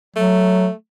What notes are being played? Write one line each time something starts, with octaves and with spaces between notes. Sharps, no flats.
F#3 A3